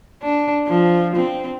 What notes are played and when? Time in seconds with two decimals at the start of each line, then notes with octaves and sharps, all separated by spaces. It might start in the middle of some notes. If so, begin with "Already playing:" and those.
0.23 D4
0.67 F3
1.16 C4